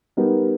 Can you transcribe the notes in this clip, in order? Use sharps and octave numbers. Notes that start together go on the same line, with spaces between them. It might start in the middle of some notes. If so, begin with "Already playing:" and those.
G3 B3 D#4 G4 A#4